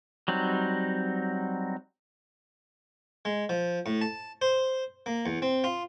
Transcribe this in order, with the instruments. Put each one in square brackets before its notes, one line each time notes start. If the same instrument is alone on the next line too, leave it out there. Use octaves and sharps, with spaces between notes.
[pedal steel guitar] F#3 G3 C4 D#4
[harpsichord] G#3
F3
A2
A5
C5
A#3
E2
C4
F4